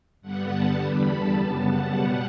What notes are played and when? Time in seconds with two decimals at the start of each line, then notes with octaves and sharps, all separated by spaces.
0.21 G2 D3 G3 B3 F#5
0.50 A5
0.79 E2 D3 G3 B3 B5
1.08 A5
1.37 F#2 C#3 G3 B3
1.65 F#5
1.94 B2 G3 B3